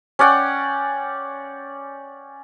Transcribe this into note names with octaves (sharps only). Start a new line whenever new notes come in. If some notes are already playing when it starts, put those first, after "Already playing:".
C#4 D5 F#5 G5